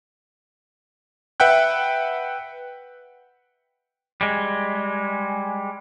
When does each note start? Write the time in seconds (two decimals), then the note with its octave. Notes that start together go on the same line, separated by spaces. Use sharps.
1.40 B4 E5 F#5 G5 F#6
4.21 G3 G#3